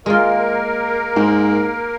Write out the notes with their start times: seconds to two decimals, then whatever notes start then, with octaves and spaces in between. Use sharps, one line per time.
0.06 G#3 A#3 F4 A#4
1.16 G#2 C5